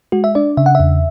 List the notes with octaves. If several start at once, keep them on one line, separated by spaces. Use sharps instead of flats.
G#3 F#4
E5
D4 D5
C#3 E5
F#5
E2 E5